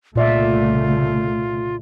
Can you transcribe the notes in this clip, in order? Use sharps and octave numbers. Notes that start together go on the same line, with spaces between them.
C2 A#2 C#3 A3 F4 D5 E5